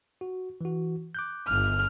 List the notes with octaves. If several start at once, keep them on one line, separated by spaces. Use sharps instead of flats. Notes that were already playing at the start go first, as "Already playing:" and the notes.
F#4
E3 F#4
D6 F#6 G6
G1 F6